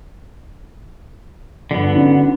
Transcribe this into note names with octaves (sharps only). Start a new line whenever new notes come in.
G2 D3 F3 B3
C#4 D#4 F#4